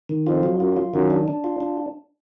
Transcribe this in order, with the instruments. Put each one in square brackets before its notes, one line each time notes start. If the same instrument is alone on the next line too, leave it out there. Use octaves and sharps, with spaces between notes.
[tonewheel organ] D#3
[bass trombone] F2 [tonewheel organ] F4
[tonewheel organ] F#3
[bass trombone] F#2 [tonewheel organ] F4
[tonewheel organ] F4
[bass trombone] F#2 [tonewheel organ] D#3
[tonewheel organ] D4
D4
F4
D4